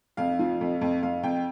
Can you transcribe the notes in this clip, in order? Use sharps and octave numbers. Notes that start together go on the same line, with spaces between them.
F2 F5
F3
F2
F2
F2 F5
F2 G5